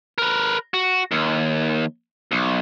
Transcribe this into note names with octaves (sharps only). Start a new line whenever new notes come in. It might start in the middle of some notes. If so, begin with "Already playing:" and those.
A#4 B4
F#4
D#2
B1